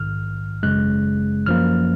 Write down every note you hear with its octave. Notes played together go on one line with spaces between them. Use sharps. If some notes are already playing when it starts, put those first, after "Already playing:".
Already playing: A#1 G#2 D#3 F6
G#1 F#2 C#3 G#3 F#6
F#2 F3 A#3 F6